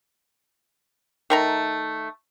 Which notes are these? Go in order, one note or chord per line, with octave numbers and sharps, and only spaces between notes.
D#3 A3 A#5